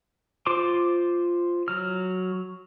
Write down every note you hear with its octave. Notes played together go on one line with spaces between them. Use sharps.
F4 C5 C6 D6
F#3 F6